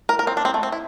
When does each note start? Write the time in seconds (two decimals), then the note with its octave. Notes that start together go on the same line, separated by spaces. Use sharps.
0.09 A#4
0.19 A#4
0.27 C4
0.37 D4
0.45 C4
0.54 A3
0.63 C4
0.72 E4